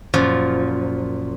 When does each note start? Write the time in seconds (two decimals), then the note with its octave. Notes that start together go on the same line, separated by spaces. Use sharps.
0.14 F#2 A#2 F3